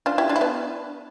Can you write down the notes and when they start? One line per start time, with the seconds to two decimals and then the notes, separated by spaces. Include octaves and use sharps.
0.06 D4 F4
0.18 E4 G4
0.29 D4 F4
0.36 E4
0.41 B3 D4